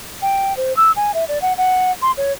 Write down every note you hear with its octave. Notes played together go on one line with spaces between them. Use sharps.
G5
C5
E6
G#5
E5
D5
F#5
F#5
C6
C#5